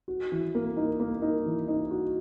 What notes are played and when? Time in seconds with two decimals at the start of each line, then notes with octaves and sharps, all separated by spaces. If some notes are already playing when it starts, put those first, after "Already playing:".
0.08 F#4
0.32 E3
0.55 A#3
0.77 D#4
1.00 A#3
1.22 D#4
1.46 E3
1.68 D#4
1.91 F#4